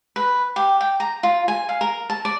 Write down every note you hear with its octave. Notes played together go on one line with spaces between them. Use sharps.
B4
G4
G5
A#5
F4
G#5
F5
A#4
A5
D5